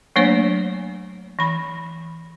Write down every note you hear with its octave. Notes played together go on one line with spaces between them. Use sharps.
F#3 A3 A#3 D4 C5 C#5
E3 B5